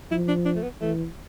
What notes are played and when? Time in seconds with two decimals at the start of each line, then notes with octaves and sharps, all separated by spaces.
0.11 F3 E4
0.28 D4
0.45 D4
0.56 A3
0.63 B3
0.81 E3 A3